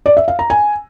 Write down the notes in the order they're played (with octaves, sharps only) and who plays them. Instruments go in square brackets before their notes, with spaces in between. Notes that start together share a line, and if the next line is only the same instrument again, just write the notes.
[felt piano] D5
E5
F5
A#5
G#5